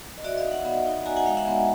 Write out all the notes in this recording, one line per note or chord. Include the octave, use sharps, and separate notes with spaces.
D#5
F#4 D5 E5
D#5 F5
D#4
E5 F#5
B3
D#4
F#4 G#5 A#5
F#5 G#5
G#3 F5 G5
E5 F#5
B3